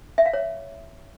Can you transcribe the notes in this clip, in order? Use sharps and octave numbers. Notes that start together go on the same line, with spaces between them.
E5
F5
C#5